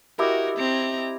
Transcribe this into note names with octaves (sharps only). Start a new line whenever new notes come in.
E4 F#4 G4 A#4 D#5
C4 A#5